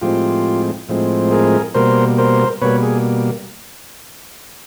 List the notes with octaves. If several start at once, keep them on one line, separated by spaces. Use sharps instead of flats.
A2 F3 G#3 C4 F4 G4
A2 F3 G#3 C4
G#4 A#4
B2 G3 A#3 A#4 C5
A#4 C5
B2 G3 A#3 B4 C#5
G#4